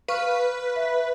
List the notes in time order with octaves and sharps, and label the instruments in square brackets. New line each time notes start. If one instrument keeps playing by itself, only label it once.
[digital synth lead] B4 [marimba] F5 C#6 F6
[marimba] E5